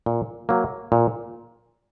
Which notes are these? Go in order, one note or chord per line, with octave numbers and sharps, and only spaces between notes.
A#2
F#3 A#3
A#2